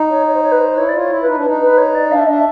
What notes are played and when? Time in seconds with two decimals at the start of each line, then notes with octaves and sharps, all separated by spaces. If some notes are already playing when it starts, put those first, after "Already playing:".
Already playing: D#4
0.09 C#5
0.26 C#5
0.34 C5
0.43 C#5
0.51 B4
0.60 C5
0.77 E4 C#5
0.88 D5
0.93 F4
0.99 C#5
1.09 E4
1.21 B4
1.27 D#4
1.37 D4
1.46 D#4
1.61 B4
1.77 C#5
1.94 D5
2.11 D4 F5
2.19 E5
2.26 D4 D#5
2.34 E5